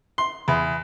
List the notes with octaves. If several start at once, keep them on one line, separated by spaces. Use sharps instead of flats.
C6
E2